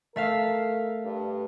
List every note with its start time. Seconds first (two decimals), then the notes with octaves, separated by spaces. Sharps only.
0.16 A3 A#4 E5 F5
1.05 G2